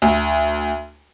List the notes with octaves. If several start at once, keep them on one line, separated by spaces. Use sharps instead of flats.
D2